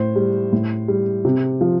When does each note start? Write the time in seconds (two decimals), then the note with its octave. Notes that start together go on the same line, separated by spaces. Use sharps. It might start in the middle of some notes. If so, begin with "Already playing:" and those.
Already playing: A2 C5
0.16 G3
0.52 A2
0.88 G3
1.25 C3
1.61 F3